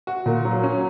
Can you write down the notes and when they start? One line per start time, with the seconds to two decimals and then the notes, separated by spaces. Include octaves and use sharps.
0.07 F#4
0.26 A#2
0.45 F#3
0.63 C#4